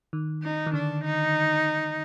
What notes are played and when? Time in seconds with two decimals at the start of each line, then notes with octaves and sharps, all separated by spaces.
0.13 D#3
0.43 D#4
0.66 D#3
0.74 D3 D4
1.05 D#4